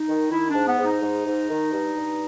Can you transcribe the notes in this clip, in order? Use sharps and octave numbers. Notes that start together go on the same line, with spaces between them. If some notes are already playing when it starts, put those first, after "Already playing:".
Already playing: D#4
D#3
D#3 E4
G#2 D4
B3
G#2
D#4
G#2
G#2
D#3
G2
G2